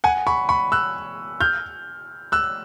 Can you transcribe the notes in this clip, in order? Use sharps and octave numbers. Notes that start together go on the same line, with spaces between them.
F#5 G#5
B5 C#6
B5 C#6
E6 F#6
F6 G6
E6 F#6